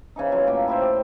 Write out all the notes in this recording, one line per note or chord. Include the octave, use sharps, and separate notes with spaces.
C#3 E3 D#4
F#3 C#4 F4
A2 A#3 G5
C5 E5 B5
G4